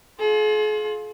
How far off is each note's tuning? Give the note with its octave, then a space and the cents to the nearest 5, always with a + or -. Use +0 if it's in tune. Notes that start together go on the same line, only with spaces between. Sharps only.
F4 +20 G#4 +45